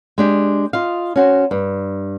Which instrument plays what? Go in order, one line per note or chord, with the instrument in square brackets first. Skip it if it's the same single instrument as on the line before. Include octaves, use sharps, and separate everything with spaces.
[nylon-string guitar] G#3 D4 G4
F4 D#5 F5
C#4 F#4 C5
G2